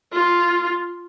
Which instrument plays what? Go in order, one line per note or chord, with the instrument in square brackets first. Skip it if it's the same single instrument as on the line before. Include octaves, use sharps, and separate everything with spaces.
[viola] F4